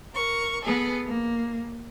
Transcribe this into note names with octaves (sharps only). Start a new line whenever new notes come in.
A#4 C#6
B3 G#4 A4
A#3